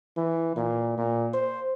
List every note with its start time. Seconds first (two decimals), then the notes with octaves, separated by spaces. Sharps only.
0.17 E3
0.56 A#2
0.98 A#2
1.33 C5